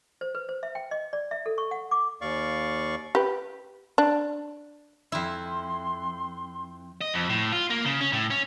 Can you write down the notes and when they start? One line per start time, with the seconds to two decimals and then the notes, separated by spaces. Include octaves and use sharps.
0.21 C5
0.35 B4
0.49 C5
0.63 E5
0.75 G5
0.91 D#5
1.13 D5
1.31 E5
1.46 A4
1.58 C#6
1.71 F#5
1.91 D6
2.21 D#2 D5 F5 C#6
3.15 G4 B4
3.98 D4
5.12 F2 E4 C6
7.01 D#5
7.14 F2
7.29 A2
7.52 F4
7.70 A#3
7.85 C#3
8.01 C#4
8.13 A2
8.30 C#4